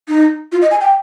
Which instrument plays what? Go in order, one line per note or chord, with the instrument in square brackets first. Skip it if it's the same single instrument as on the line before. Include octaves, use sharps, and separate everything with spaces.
[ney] D#4
F4
D#5
G#5
G5